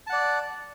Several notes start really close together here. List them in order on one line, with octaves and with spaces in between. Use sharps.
A5 F#5 D5